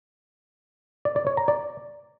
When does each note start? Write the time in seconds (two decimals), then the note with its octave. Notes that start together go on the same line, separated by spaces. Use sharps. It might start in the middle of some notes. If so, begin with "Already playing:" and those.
1.05 D5
1.16 D5
1.27 C#5
1.37 A#5
1.48 D5